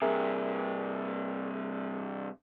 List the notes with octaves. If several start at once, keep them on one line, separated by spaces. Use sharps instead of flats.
G2 C3 G#4 A#4 E5